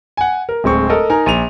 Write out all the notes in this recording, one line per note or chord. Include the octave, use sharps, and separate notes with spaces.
F#5 G#5
A#4
D1 G#3 C4 C#6
A4 A#4 D#5
D#4 A#4 G#5 A#5
A#1 D#7 F7